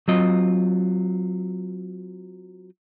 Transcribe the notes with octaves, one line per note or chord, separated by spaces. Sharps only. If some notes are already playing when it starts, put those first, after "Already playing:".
F#3 C4 F4 D#5